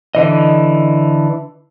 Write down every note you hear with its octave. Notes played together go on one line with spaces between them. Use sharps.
D3 E3 D#5